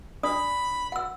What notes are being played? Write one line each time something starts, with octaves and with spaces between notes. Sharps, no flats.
D4 D5 B5 D#6
F#5 E6